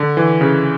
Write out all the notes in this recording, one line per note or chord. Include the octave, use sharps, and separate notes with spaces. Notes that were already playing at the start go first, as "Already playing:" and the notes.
Already playing: D3
E3
C#3